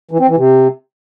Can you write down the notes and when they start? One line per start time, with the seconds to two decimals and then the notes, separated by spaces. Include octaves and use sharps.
0.11 E3
0.20 C4
0.28 E3
0.37 C3